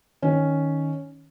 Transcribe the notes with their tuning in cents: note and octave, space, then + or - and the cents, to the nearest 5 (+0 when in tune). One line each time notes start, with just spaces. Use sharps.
D#3 +0 C#4 +0